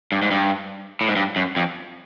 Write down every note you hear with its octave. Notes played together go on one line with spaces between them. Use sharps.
G2
G#2
G2
A2
G#2
G2
F#2
F2